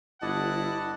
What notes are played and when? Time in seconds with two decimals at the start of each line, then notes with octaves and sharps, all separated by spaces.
0.22 G1 E4 D5 D#5 F#5 A5